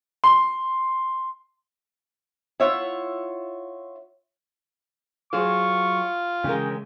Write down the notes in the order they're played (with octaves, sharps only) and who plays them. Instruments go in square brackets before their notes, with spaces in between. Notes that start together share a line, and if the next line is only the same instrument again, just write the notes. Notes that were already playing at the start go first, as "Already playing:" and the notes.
[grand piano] C6
[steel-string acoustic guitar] E4 F4 C#5 E5 F#5
[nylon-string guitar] F#3 G#4 C5 [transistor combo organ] F4 [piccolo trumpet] C#6
[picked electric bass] C#3 [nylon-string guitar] E3 G#3 A#4 [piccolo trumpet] G5